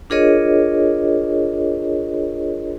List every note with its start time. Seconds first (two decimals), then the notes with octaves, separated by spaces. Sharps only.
0.10 D4 F4 G#4 A#4 C#5 D#5